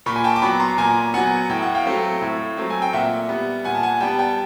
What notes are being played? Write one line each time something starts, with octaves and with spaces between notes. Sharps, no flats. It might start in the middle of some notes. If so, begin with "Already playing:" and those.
A#2 B5 C#6
G#5
G5 A5
D6
F#3 B3 B5 C#6
A#5 C6
A#2 G#5 A#5
F#3 B3 F#5 G#5
A2 G5
F#5
F5 G5
F#3 A3 C4
A2
F#3 A3 C4
G#5
G5
A#2 E5 F#5
G3 B3
A#2 F#5 G#5
A5
F#5 G#5
G3 B3 G5 A5
G5 A5